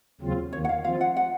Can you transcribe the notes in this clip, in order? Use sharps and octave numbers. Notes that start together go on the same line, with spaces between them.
D#2 C#3 F#3 C4 F4
D#2 D#3 A#3 C#5
F#5
F5
F3 C4 F4 F5
F#5
F#5